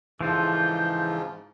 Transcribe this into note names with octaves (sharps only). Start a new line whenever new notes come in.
G#2 C#3 E3 F3 F4 A4 G6